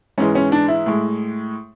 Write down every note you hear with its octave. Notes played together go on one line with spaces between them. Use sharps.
G#2 E3 G#3 C#4
C#4
D4
E4
A2 G#3